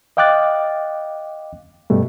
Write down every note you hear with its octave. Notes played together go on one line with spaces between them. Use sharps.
D#5 F5 G5 D6 F#6 A6
G2 B2 G3 A3